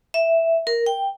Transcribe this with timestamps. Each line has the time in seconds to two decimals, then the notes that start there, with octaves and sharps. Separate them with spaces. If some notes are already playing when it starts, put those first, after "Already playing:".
0.14 E5
0.67 A#4
0.86 G5